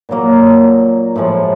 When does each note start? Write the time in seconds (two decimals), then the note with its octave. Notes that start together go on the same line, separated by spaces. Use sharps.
0.09 A#2 F#3 A#3
1.16 A2 F3 G#3